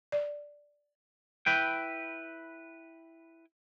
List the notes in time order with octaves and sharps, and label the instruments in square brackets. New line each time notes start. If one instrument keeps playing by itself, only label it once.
[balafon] D5
[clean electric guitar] E4 B4 G5